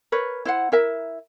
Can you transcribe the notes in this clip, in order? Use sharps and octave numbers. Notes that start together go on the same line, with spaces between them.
A#4 B4 C#5
E4 C5 F#5
E4 A#4 E5